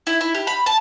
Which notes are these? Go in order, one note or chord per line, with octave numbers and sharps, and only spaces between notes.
E4
E4
G4
B5
A5